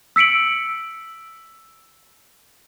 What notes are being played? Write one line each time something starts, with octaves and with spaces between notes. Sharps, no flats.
E6 B6 C#7 D7 F#7